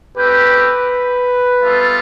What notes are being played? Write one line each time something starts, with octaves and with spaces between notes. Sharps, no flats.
A3 C4 G4 B4
G3 B3 F4 A4 E5